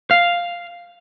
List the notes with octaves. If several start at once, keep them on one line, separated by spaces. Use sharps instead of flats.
F5